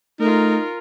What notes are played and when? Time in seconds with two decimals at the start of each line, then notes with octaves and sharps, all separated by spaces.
0.20 A3 D#4 F4 A#4